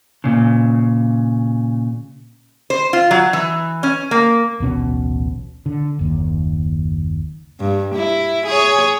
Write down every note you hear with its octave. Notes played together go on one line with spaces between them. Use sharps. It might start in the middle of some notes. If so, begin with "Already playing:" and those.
A#2 C#3
C5
F4
F#3
E3
C#4
A#3
D1 A1 B2 C#4
D3
F#1 D#2
G2
E4
G#4 C#5